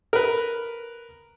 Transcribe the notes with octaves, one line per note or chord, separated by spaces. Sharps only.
A#4 B4